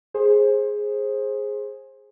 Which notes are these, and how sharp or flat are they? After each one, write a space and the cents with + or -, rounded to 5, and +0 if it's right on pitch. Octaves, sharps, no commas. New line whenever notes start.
G#4 +0 C5 +25